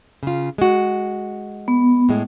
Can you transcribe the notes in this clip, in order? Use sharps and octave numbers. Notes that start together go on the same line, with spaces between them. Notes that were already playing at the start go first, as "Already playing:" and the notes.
C#3 F4
G#3 F#4
B3
A2 G#3